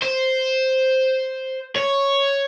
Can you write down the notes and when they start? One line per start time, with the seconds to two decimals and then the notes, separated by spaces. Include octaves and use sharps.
0.03 C5
1.76 C#5